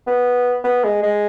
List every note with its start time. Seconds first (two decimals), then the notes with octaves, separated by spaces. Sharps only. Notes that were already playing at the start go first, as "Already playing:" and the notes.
0.07 B3
0.64 B3
0.84 G#3
1.02 G#3